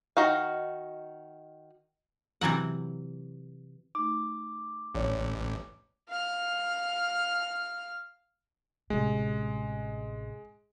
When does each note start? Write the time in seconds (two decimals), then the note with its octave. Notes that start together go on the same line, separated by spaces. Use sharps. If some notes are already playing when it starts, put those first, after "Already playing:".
0.17 D#3 D#4 F#4 F5
2.41 C3 E3 F#3 F#5
3.95 A3 D#4 D6
4.95 A1 C#5 D5
6.08 F5 F6
8.90 A1 C3 G#3